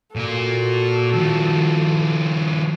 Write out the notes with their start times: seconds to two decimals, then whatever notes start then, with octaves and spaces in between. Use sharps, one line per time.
0.16 A#2 F#4 A4 A#4
1.14 D#3 F3